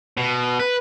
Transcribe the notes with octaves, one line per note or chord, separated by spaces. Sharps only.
B2
B4